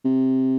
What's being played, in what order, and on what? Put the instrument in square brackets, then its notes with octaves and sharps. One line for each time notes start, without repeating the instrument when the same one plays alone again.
[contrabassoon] C3